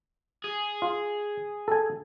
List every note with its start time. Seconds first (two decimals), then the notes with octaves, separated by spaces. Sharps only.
0.44 G#4
0.82 F4
1.68 A4 G#5